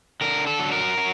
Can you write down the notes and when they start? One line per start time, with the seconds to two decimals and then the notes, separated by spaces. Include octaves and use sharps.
0.21 D3 A#4
0.47 A4
0.59 F#3
0.72 A#4
0.98 F#3